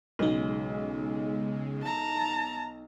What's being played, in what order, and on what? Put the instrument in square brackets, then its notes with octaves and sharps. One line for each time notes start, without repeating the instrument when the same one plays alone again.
[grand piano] B1 [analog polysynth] C#3 G#3 [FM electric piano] B3 D#4
[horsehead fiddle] A5 A#5